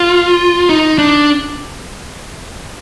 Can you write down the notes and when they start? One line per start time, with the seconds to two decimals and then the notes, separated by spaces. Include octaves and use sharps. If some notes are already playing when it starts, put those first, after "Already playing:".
Already playing: F4
0.69 D#4
0.98 D4